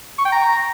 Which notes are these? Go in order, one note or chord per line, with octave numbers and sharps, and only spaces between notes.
C#6
G5
A#5